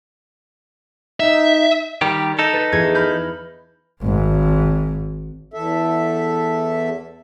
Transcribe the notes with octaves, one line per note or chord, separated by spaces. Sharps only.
D#4 E5
D#3 G3 G4
D#4 A4
B4 A6
E2 G#6
B5 F6 G6
G#1 G#2
E2 A4 E5